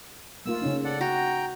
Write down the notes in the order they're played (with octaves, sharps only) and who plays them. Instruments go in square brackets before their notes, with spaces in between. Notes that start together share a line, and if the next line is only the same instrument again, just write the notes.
[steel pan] A3 A#3 F4 [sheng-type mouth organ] E6
[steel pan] C#3 C#4 D#4
[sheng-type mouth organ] A4 D5 F#5
[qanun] F#4 [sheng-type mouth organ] G5 A#5